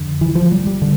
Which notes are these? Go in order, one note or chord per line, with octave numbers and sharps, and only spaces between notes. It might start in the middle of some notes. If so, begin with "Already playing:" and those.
Already playing: F2 D3
E3
F3
G3
G3
D3